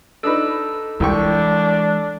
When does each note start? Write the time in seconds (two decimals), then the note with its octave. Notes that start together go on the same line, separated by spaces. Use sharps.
0.23 D4 D#4 A4 B4 E6
1.00 C2 E3 G#3 D4 G5 C#6